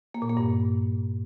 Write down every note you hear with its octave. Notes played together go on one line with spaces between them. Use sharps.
A#3
A#2
A#3
G2